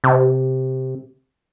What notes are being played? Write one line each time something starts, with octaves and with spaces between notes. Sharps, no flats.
C3